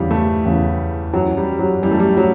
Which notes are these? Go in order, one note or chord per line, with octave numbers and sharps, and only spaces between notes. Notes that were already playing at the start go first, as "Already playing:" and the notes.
Already playing: E2 C#3 E3 G3
A3
E2 C#3 E3
F#2 E3 F#3
G3
F#3
F#2 E3 G3
A3
G3
F#3